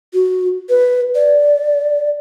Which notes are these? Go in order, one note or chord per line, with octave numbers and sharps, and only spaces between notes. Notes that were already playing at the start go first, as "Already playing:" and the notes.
F#4
B4
D5